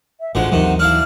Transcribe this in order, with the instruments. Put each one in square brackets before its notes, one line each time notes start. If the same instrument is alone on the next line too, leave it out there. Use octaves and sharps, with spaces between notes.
[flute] E5
[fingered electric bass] A1 [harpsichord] D2 F3 G#3 [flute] F#5
[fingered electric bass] D#2 E3 F#3 [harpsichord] C3 D#3
[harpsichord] D4 E4 F5 [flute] F6